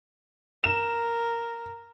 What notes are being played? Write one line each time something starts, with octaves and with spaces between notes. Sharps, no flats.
A#4 E7